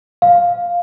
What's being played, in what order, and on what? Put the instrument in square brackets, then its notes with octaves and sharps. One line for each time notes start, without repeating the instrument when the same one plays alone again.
[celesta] F5